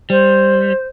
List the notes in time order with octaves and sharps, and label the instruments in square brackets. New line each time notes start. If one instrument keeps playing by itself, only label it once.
[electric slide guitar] G3 [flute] C5